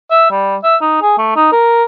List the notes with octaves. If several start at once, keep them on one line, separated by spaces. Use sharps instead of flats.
E5
G3
E5
D#4
G#4
A3
D#4
A#4